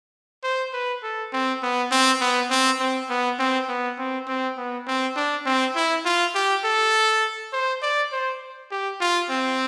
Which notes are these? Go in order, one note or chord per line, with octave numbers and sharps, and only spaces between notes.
C5
B4
A4
C4
B3
C4
B3
C4
C4
B3
C4
B3
C4
C4
B3
C4
D4
C4
E4
F4
G4
A4
C5
D5
C5
G4
F4
C4